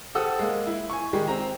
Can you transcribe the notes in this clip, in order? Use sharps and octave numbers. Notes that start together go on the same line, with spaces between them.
G4 A4 C5 F#5 D#6 E6
G#3 A#3
E4
G#5 C#6
D#3 G3 G#3 G4
C4 A#5